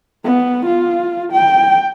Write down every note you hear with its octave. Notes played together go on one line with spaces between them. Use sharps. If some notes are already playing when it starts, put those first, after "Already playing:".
B3
F4
G5